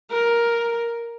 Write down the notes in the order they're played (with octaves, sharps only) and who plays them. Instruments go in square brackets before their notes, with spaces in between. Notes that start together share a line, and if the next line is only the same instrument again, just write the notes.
[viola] A#4